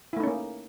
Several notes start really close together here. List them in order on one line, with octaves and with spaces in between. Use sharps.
E4 A3 D#4 C#4 A#3